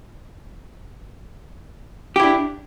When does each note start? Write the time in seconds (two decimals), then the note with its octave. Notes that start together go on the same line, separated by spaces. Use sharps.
2.16 G4
2.20 E4
2.23 D4